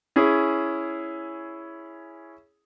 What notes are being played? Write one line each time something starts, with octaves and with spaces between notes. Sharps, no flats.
C#4 E4 G#4